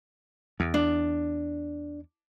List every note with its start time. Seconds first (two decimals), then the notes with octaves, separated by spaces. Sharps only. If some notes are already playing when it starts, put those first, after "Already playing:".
0.60 E2
0.74 D4